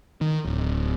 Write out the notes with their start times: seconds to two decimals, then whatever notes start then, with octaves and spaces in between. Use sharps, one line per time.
0.21 D#3
0.45 D1